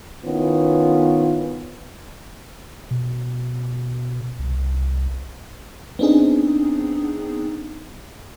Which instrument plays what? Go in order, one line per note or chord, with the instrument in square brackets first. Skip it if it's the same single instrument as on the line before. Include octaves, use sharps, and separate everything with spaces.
[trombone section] D#3 B3 C#4 E4 F4
[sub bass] B2
C2
[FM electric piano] B3 C4 D4 D#4 G#4